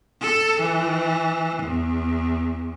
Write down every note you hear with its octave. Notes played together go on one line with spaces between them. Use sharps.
A4
E3
E2